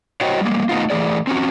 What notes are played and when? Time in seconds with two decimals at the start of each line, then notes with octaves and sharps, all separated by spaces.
0.21 F#4 C5 C#5 D#5 G5
0.41 G3 G#3 A#3
0.69 A3 B3 D#4 F4
0.90 E3 A3 G#4 D5
1.27 C4 C#4 F#4